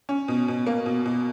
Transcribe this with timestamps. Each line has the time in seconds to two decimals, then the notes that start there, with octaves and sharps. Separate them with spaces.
0.09 C#4
0.28 B2
0.48 B2
0.67 A#3
0.86 B2
1.06 B2